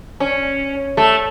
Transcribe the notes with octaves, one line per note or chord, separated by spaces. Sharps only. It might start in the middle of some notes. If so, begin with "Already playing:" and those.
C#4
A3